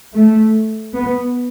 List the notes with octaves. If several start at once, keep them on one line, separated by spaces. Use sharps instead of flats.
A3
B3